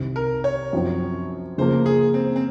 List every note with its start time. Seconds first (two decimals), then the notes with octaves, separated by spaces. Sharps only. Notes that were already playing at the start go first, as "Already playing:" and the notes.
Already playing: C2 C3 D#3
0.16 A#4
0.44 C#5
0.73 F#2 F3 C4 F#4
1.58 C#3 F3 A#3 C5
1.86 G#4
2.14 C4
2.36 C4